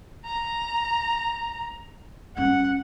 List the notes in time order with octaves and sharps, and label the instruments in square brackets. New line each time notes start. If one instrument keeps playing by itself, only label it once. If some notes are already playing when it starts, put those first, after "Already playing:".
[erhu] A#5
[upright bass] G2 C#4 [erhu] F#5